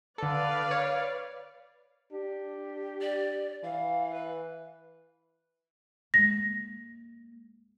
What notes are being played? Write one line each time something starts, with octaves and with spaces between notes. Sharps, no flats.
D3 A4 B4 D5 F5
C#5
D4 G4
D5
E3 F5
B4
G#3 A#3 A#6